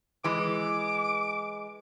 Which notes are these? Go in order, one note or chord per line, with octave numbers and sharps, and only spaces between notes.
E3 G#3 D6